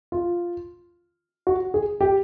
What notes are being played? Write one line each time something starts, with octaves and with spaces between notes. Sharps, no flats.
F4
F#4
G#4
G4